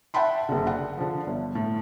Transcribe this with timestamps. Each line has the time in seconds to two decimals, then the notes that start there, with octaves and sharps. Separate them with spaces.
0.14 E5 F#5 G5 A5 B5 C6
0.49 F#1 D3
0.67 F#5
0.97 D3 F3
1.27 G1
1.55 A2